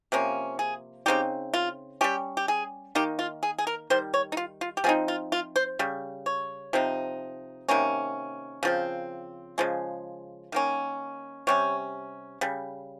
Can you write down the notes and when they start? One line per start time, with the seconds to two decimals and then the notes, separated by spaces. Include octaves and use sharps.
0.12 C3 F3 A#3 C#4
0.59 G#4
1.06 C#3 G#3 C4 D#4 G4
1.54 F4
2.01 G3 C#4 G4
2.37 G4
2.48 G#4
2.95 D#3 A#3 D#4 G4
3.19 F4
3.43 G#4
3.59 G#4
3.67 A#4
3.90 D#3 G3 C5
4.14 C#5
4.32 D#4
4.37 F4
4.61 F4
4.77 G4
4.84 F3 C4 D#4 G#4
5.08 F4
5.32 F4
5.56 C5
5.79 C#3 G3
6.26 C#5
6.73 C3 F3 C4 D#4
7.69 C3 D#3 A#3 C#4
8.63 C#3 F3 C4
9.58 C#3 F3 G#3
10.52 D#3 A#3 C#4
11.47 C3 G3 C#4 C#5
12.41 C#3 G3